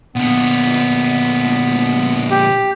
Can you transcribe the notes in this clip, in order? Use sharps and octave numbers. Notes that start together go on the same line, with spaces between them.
A#2 D3 B3
G4